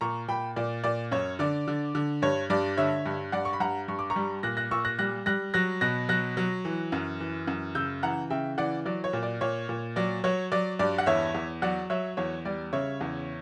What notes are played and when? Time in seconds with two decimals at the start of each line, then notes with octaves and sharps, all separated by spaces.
0.01 A#2 A#5 C#6
0.28 A#2 G5 B5
0.56 A#2 D5
0.84 A#2 D5
1.12 F#2 C#5
1.39 D3 D5
1.68 D3
1.95 D3
2.22 G2 C#5
2.50 G2 D5
2.77 D3 C#5 E5
3.06 G2
3.32 G2 D5 F#5
3.45 C#6
3.53 B5
3.60 G2 F#5 A#5
3.88 G2 C#6
3.99 D6
4.10 A#5 C#6
4.16 G3
4.43 A#2 F#6 A#6
4.57 F#6 A#6
4.71 A#2 C#6 E6
4.85 F#6 A#6
4.99 G3 F#6 A#6
5.26 G3 F#6 A#6
5.54 F#3 F#6 A#6
5.81 B2 F#6 A#6
6.09 F#3 F#6 A#6
6.37 F#3
6.65 E3
6.92 F#2
7.20 E3
7.47 F#2
7.75 C#3 E6 G6
8.03 E3 F#5 A#5
8.30 C#3 E5 G5
8.58 E3 D5 F#5
8.85 F#3 D5
9.04 C#5
9.13 A#2
9.23 D5
9.41 A#2 C#5
9.69 A#2
9.96 F#3 D5
10.24 F#3 C#5
10.52 F#3 D5
10.79 G2 D5
10.98 F#5
11.06 E2 C#5 E5
11.34 E2
11.62 F#3 D5 F#5
11.90 F#3 C#5 E5
12.17 E2 C#5
12.45 G3 D5
12.73 C#3 C#5 E5
13.01 E2